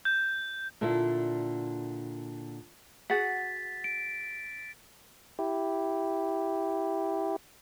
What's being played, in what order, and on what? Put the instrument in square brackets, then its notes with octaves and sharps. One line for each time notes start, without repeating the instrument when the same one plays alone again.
[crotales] G6
[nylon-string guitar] A#2 D3 D4 E4 A4
[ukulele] F#4 G#4 F#5 [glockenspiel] A6 B6
[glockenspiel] D7
[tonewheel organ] E4 G4